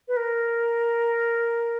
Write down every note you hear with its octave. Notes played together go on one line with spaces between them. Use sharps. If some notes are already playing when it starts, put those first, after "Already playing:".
B4
A#4